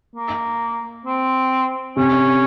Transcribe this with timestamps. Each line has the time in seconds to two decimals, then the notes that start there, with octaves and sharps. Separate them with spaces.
0.15 A#3
1.06 C4
1.97 C3 C#4